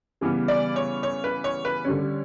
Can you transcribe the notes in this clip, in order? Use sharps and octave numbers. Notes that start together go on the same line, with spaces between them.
C#3 E3 G3 B3
D5
C#5
C#5
B4
C#5
B4
D3 G3 C#4